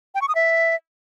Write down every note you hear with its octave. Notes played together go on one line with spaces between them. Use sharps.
G5
C#6
D#6
E5